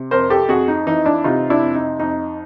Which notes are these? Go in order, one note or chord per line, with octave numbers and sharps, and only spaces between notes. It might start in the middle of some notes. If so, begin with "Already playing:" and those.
Already playing: C3
F2 A#4 C5
G4 A4
F2 F#4 G#4
D#4
E3 D#4
D4 E4
C3 D#4 F4
D4 E4
F2
D#4
F2 D#4